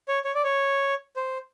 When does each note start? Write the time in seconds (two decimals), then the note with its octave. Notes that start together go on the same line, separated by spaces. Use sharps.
0.08 C#5
0.24 C#5
0.35 D5
0.44 C#5
1.16 C5